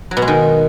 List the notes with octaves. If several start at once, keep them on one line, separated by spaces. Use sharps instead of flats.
F#3
B2
G#3
D#3